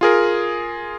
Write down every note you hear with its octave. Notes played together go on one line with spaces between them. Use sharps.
F4 G#4 A#4